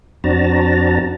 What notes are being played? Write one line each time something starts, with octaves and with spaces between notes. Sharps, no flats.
F2 C4 D4 F#4 A5 A#5